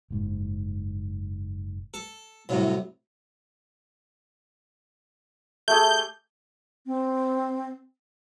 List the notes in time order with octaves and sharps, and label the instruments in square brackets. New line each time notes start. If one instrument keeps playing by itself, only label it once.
[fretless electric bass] F#1 G#2
[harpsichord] A4
C2 F#2 A2
[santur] A3 G4 G#4 [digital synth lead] G6
[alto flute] C4